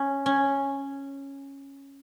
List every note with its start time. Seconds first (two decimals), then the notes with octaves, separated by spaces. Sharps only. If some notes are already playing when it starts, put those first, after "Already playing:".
Already playing: C#4
0.26 C#4